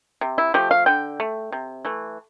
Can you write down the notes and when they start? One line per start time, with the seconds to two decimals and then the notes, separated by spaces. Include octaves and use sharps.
0.21 C3
0.38 E4
0.54 F3 A3 G4
0.71 F5
0.86 D3 G5
1.20 A3
1.52 C3
1.85 E3 A3